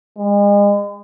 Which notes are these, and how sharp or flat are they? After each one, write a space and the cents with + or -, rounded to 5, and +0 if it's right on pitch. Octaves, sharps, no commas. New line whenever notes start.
G#3 -35